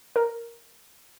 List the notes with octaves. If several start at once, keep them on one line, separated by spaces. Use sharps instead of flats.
A#4